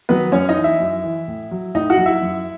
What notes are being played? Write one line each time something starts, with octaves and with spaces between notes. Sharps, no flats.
D#3 F#3 B3 B4
F#2 C#4 C#5
D#4 D#5
E3
E4 E5
F#2
E3
A2
F#3
A2 D#4 D#5
F#4 F#5
F#3
E4 E5
F#2